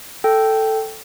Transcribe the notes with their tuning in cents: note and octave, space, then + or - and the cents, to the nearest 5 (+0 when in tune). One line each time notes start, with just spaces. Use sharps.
A4 +0 G5 -10